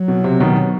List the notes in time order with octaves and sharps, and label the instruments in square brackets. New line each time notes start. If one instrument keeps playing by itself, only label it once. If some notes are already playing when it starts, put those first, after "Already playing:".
Already playing: [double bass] F#3
[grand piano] B2
C3
B2 D#3